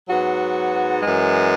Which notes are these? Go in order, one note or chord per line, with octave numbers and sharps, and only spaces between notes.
G#2 F#3 B3 F#4
F#2 E3 G#3